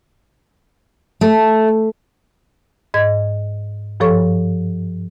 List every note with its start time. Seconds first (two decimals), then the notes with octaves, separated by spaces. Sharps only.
1.21 A3
2.94 G#2 D#5 G#6
4.00 G2 F3 A4 C#5 C#6